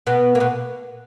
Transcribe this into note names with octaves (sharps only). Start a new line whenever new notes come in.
B2 B3
A#3
B2 B3